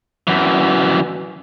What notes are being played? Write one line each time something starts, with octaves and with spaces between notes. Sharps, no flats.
F#2 E3